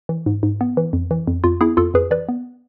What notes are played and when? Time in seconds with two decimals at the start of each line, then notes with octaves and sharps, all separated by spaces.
0.09 E3
0.26 G#2
0.43 G#2
0.61 B3
0.77 E3
0.93 F2
1.11 E3
1.27 F2
1.44 F2 F4
1.61 B3 E4 G#4
1.77 F2 F4 A4
1.94 F2 G#4 B4
2.11 E3 B4 D5
2.29 B3